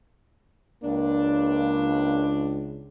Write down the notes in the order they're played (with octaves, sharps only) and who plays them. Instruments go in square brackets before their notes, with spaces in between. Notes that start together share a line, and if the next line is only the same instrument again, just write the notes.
[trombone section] C#2 [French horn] A#3 [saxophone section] D4